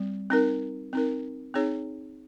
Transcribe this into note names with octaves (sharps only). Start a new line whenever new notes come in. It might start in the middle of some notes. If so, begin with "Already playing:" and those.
Already playing: G3 C4
C4 D#4 A#4
C4 D#4 A#4
C4 D#4 G#4 C#5